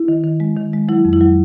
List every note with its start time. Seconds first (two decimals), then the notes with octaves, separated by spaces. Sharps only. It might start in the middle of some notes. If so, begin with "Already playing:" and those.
Already playing: E4
0.08 D#3
0.24 D#3
0.40 G#3
0.57 D#3
0.73 G#3
0.89 F#3 E4
1.05 F2
1.13 E4
1.21 F#3